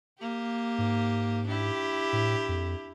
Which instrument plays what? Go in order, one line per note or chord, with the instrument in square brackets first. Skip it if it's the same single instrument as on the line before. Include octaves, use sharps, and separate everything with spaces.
[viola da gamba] A#3 G4
[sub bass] G#2
[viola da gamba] D4 E4 G4
[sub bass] A2
F2